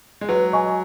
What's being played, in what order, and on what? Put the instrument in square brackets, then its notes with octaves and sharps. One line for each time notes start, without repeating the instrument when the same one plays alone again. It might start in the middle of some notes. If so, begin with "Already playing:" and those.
[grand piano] G#3
[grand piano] F#3 [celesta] B4
[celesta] D#5 G#5 C#6